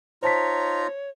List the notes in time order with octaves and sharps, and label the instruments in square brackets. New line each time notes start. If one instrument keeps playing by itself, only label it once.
[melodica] D#4 F4 A#5 [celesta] C5 A5 B6 [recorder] C#5